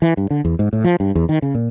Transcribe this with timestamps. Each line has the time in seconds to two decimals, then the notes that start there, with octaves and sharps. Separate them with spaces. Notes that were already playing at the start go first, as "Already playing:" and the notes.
0.02 E3
0.17 G2
0.30 D3
0.45 E2
0.59 G#2
0.73 A2
0.84 F3
1.00 G2
1.15 E2
1.29 D#3
1.42 C#3
1.55 A#2